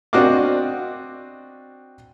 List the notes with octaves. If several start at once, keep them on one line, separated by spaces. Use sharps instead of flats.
C4 D4 F#4 D#5 F5 D6